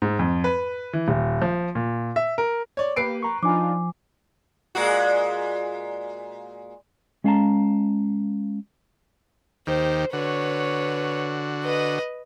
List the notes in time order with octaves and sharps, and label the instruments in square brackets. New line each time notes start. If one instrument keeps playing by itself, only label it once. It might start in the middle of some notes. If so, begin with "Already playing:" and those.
[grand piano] G#2
F2
B4
E3
D#1
F3
A#2
E5
A#4
[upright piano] C#5 D5
[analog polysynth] A#3 G4 [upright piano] B4 C7 D7
[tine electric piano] A#5 C#6
[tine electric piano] F3 [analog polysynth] D4 D#4 F4 [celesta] G#5 D6
[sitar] A#2 G#3 F#4
[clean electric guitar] G#3 C#4 F5 G5 A5 A#5
[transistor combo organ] D#2 D#3 G4 [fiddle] C5
[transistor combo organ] D3 F#4 [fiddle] B4 C#5
[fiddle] B4 D#5